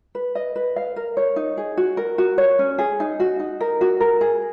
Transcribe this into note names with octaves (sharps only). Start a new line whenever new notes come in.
B4
D#5
B4
F5
A#4
C#5
D#4
G#4
F#4
A#4
F#4
C#5
C#4
G#4
D#4
F#4
D#4
A#4
F#4
A#4
G#4